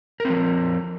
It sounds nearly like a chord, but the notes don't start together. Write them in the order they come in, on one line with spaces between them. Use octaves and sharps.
A#4 C4 F3